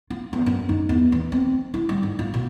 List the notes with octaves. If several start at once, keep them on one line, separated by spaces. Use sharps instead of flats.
F4
E2
F#2
D#4
E2
E3
C4
E4
G3
G#2
F4
B2